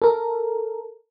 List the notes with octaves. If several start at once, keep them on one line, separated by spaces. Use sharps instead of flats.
A4 A#4